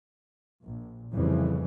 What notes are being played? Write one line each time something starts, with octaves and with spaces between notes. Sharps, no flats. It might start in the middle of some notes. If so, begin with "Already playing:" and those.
A#1
F1 F2 C#3 E3 G3